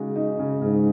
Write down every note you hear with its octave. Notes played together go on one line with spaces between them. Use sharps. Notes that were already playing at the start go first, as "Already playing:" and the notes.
Already playing: C#3 G#3 D#4 F#4
D#4
C#3
G#2 C#3